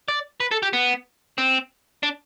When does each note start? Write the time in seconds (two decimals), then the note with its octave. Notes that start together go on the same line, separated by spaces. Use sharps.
0.08 D5
0.40 B4
0.51 A4
0.63 G4
0.73 B3
1.38 C4
2.03 D4